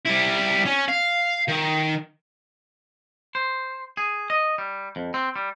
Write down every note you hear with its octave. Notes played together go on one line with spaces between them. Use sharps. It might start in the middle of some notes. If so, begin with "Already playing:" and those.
G3 E4
C#4
F5
D#3
C5
G#4
D#5
G3
F2
C4
G3